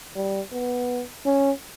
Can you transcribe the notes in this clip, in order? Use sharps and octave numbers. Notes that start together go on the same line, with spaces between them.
G3
B3
C#4